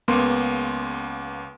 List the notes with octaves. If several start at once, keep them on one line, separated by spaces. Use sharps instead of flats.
C#2 A#3 B3 C6